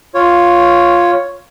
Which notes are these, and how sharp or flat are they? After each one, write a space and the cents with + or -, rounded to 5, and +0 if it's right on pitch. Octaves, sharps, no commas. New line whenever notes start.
F4 +0 C#5 +0